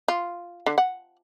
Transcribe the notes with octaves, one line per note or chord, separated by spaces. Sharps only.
F4
D3
F#5